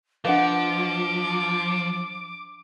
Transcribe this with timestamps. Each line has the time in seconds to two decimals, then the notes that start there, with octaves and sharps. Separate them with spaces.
0.25 F3 D4 B4 D#5 F5 F#5 D6